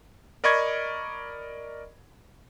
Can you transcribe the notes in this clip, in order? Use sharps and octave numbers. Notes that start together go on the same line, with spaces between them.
A#4 D5 D#5 B5 C#6 G#6